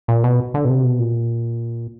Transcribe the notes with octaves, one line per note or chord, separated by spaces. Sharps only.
A#2
B2
D3
B2
C3
B2
A#2